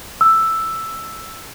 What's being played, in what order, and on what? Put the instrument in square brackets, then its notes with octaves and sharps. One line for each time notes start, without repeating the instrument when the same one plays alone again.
[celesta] E6